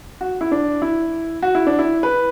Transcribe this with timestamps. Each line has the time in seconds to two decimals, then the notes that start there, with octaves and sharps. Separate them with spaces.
0.21 F#4
0.41 E4
0.52 D4
0.82 E4
1.42 F#4
1.55 E4
1.67 D4
1.79 E4
2.03 B4